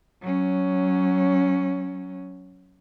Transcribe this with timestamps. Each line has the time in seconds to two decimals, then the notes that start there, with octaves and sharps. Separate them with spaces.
0.21 F#3 C#4